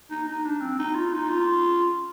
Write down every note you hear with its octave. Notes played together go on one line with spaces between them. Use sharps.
D#4
D#4
D4
C4
D#4
F4
D#4
F4